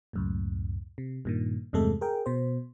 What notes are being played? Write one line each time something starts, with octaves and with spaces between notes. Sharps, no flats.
C#2 F#2 A2
C3
G2 A#2 D#3
E2 G2 C3 G#3 A3 A4
G#4 A#4 G5
B2 C5